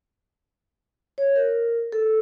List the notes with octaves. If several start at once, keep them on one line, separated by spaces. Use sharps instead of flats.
C#5
A#4
A4